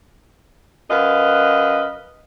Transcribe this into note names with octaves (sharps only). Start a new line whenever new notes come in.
F#2 B4 D#5 F5